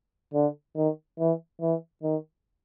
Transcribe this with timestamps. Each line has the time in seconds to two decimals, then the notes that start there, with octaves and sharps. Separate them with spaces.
0.34 D3
0.76 D#3
1.19 E3
1.61 E3
2.03 D#3